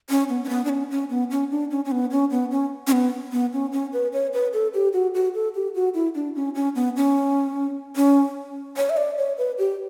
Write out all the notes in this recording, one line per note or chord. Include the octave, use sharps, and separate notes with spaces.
C#4
B3
C#4
B3
D4
C#4
C#4
B3
C#4
D4
C#4
C#4
B3
C#4
B3
C#4
C#4
B3
B3
C#4
C#4
B4
C#5
B4
A4
G4
F#4
F#4
A4
G4
F#4
E4
D4
C#4
C#4
B3
C#4
C#4
C#5
E5
D5
C#5
B4
G4